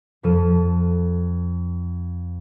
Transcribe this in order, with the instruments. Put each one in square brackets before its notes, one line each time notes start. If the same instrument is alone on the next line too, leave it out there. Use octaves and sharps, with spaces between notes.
[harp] F2 F3 A4 D#7